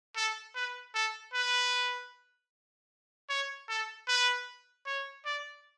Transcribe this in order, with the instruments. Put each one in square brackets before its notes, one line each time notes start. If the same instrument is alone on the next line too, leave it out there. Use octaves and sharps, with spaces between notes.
[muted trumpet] A4
B4
A4
B4
C#5
A4
B4
C#5
D5